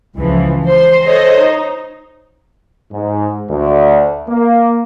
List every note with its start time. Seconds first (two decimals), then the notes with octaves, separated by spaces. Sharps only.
0.16 C#2 E3 F3
0.66 C5 C6
1.04 A4 C5 C#5 D#5
1.37 D#4
2.91 G#2
3.49 D2
4.28 A#3